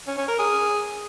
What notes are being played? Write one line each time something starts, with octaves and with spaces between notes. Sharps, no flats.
C#4
C#4
A#4
G#4